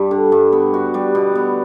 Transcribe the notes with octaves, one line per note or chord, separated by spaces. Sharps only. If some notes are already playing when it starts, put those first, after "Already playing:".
Already playing: G2 G3
D3
G2
B3
F#4
G3
B2
B3